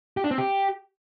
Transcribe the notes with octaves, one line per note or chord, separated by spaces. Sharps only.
G4
D4
C4
G4